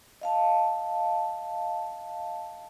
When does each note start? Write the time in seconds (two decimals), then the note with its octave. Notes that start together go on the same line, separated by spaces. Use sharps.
0.21 D#5 F5 A5